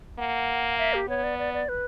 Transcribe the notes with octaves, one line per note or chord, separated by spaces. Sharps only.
A#3 F#5
E5
G4
B3 C#5
D5
D5
D5
B4